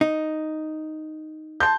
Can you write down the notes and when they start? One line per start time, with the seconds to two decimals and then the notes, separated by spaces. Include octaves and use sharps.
0.01 D#4
1.60 A5 C6 G6